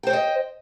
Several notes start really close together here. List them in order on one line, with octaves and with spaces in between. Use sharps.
G5 C5 C#5 D#5